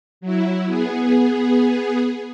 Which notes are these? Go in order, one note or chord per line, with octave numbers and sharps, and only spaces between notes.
F#3 E4
B3 G#4